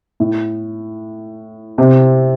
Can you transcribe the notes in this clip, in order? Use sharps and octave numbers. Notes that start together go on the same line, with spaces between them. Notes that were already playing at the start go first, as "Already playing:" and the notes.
A2
C3